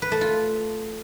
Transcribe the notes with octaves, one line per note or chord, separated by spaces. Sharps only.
B4
A3
F4